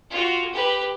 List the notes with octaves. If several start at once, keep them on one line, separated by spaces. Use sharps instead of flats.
F4 F#4
G4 B4